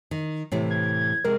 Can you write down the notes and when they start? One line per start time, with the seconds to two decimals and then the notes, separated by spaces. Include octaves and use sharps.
0.11 D#3
0.52 A2 C3 E3
0.71 G#6
1.25 C3 G#3 A#4